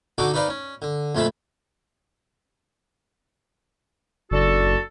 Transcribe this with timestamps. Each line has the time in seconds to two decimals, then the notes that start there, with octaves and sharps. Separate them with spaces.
0.18 D3 D#4 F#4 A4 D6
0.34 D#4 B4 C5 D5 F5
0.48 C#4
0.82 D3
1.15 F2 A#2 A3 C5 A5 B5
4.31 F#1 D4 F#4 A4